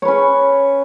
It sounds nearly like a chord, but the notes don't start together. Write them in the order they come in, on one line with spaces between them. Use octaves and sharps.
C#5 B4 C#4